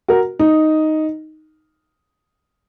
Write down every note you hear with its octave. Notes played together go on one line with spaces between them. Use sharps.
F#4 A#4
D#4